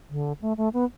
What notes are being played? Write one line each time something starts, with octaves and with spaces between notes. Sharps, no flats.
D3
A3
A3
B3